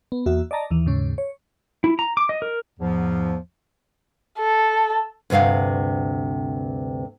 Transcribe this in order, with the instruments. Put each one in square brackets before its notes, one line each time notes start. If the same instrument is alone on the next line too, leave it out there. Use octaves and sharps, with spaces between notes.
[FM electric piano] B3
E2 A#3 F#4 E5
D5 D#5 A5 A#5
D#2 E3
D#2 G#2 C#3 C#4
C#5
[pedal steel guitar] E4
A#5
D6
D#5
A#4
[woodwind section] E2 G#2 F3
[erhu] A4
[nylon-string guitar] D2 G2 C3 F5 F#5